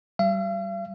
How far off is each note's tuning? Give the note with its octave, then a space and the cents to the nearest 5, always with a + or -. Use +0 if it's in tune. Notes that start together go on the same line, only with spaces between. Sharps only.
G3 -20 F5 -45